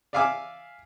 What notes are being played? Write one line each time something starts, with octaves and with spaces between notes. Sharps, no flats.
D5 E5 F5 G#5 D6 E6